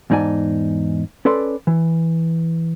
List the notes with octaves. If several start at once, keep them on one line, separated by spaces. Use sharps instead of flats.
E2 G#2 D#4 D5 G#5 A5
C#4 A4 B4 D5 C6
E3